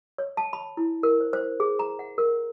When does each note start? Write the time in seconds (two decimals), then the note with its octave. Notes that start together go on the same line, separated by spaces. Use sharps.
0.18 C#5
0.37 A5
0.53 B5
0.77 E4
1.03 A#4
1.20 C5
1.33 C5
1.60 G#4
1.79 A#5
1.99 F#5
2.18 A#4